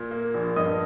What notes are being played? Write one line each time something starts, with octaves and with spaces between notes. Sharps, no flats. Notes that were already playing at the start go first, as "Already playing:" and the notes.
Already playing: A#2
A#3
A#1
G2 D#5 D#6